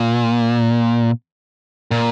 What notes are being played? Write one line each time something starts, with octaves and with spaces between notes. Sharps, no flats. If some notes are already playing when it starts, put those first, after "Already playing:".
Already playing: A#2
A#2